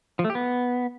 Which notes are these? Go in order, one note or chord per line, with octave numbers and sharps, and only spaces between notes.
F3
A3
G4
B3